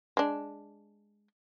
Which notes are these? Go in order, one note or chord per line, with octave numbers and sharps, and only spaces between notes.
G#3 D4